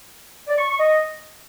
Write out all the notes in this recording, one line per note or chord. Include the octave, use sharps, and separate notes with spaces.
D5
C#6
C#6
D#5